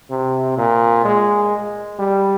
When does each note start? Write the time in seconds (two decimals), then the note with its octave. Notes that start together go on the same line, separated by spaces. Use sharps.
0.10 C3
0.58 A#2
1.05 G#3
1.99 G3